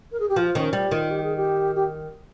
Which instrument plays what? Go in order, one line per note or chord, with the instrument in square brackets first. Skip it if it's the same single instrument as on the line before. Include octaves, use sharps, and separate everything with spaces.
[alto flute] A#4
G#4
G4
[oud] F3 [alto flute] F4
[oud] D#3 [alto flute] C#4
[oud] G3 [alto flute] G4
[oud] D#3 [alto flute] F4
[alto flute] G4
G#4
G4
G4